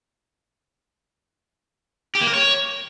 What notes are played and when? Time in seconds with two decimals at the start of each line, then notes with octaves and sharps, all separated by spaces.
2.15 G4
2.21 A#3
2.27 A#4
2.34 C#5